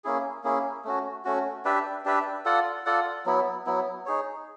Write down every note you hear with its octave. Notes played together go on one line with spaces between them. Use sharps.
A#3 C#4 E4 G#4
A#3 C#4 E4 G#4
A3 C#4 F#4
A3 C#4 F#4
D4 G4 B4 E5
D4 G4 B4 E5
F4 A4 D5 F#5
F4 A4 D5 F#5
F#3 B3 E4
F#3 B3 E4
D#4 G#4 C#5